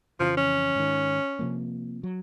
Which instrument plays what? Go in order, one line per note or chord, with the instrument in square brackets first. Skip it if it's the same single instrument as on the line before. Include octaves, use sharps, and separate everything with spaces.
[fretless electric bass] F2 C#3 E3 [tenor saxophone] F3
[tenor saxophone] C#4
[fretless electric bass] G#2 D#3
C3 F3 A#3
F#3